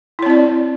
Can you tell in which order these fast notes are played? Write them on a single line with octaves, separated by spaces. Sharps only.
E4 C#5 C4 D5